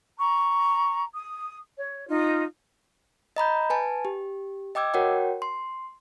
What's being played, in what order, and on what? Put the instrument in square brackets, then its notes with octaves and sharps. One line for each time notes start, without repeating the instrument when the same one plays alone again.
[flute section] A#5 C#6
D#6
C#5
D#4 F4
[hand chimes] D#5 A#5 B5 G6
B4 G#5 A5
G4
D#5 G5 D6 E6 G#6
F#4 A#4 C#5 F#5 G5
C6